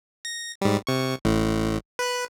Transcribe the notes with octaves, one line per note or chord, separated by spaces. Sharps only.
A#6
G#2 G3
C3 C#6
A1 A2
B4 F#6